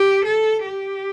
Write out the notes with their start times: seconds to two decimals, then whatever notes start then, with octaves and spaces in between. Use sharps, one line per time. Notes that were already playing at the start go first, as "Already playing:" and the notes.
Already playing: G4
0.25 A4
0.66 G4